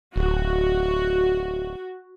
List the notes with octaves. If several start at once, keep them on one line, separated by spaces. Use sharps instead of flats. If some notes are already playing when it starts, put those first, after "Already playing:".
D1 F#4